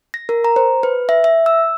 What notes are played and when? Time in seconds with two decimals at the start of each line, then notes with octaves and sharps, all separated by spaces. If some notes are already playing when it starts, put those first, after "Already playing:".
0.14 A#6
0.29 A#4
0.44 A#5
0.56 C5
0.83 B4
1.09 E5
1.24 E5
1.46 E6